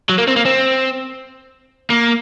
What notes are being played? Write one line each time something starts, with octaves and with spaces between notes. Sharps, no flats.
F#3
A#3
C4
A#3
C4
A#3